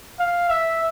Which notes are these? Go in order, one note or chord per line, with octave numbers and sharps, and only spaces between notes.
F5
E5